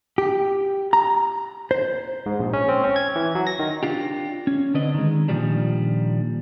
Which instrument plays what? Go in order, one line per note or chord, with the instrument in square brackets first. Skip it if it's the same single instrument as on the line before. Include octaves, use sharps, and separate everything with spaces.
[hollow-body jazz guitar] G4
A#5
C5
[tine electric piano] G#2
A#1
C#4
C4
C#4
G#6
E3
F#3
A#6
D#3
[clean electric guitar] D4 F4 G4
C#4
D3 C4 D4 B4 D#5
D#3 G#3
A#2 D#3 F3 G3 D4